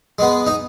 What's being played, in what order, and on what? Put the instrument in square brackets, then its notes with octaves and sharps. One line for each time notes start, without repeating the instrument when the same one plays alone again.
[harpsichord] G#3 B3
D#4